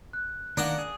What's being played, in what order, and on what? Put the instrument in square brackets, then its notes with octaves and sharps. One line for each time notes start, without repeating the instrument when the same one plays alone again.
[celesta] F#6
[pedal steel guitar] D#3 A#3 [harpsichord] D4 F#5
[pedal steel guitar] G#4